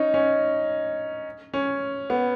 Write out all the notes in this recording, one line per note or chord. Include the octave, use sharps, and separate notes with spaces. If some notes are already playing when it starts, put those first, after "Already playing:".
Already playing: C#4 D#4
C#4
C#4
B3